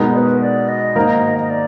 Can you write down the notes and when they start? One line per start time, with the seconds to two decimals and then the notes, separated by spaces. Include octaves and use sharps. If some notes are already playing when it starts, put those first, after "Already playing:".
Already playing: B2 G#3 B3 D#4 A#4
0.13 D5
0.17 B4
0.41 D5
0.68 D#5
0.96 G#2 D#3 A#3 D#4 A#4
1.39 D#5
1.50 D5